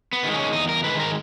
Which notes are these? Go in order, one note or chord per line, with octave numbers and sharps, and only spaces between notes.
B3
D#3 G#3
C#4
E2 D#4
A#4
D#3 G#3 B4
A#4